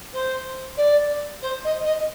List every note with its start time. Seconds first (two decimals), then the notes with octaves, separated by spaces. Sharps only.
0.14 C5
0.77 D5
1.42 C5
1.64 D#5
1.85 D#5